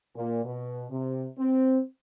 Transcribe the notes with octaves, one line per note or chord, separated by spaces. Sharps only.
A#2
B2
C3
C4